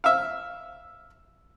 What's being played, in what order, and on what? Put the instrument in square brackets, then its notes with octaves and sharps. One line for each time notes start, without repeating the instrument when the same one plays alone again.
[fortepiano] E5 F5